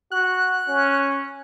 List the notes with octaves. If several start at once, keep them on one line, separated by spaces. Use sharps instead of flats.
F#4 F#6
C#4